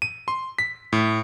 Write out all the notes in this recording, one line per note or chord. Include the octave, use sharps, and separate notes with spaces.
D#7
C6
B6
A2